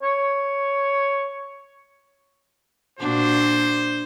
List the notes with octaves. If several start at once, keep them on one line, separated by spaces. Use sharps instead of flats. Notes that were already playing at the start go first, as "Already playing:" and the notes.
C#5
A#2 D4 F#4 C5